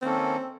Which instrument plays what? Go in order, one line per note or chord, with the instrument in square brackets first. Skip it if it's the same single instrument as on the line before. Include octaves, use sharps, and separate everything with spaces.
[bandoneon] D#3 A#3 C#4 A4 [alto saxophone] C4